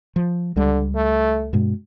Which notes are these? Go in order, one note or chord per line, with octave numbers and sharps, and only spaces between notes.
F3
C#2 D3 G3
A3
G2 B2 G#3